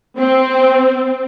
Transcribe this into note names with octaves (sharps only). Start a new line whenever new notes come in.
C4